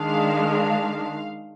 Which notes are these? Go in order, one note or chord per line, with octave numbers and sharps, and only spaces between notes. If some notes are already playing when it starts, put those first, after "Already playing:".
Already playing: D#3 G#3 D4 F5